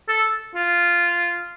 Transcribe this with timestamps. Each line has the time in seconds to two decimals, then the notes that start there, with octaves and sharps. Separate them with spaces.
0.09 A4
0.55 F4